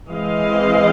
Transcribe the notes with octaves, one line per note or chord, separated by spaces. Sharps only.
E3 G#3 C4 D#5 F5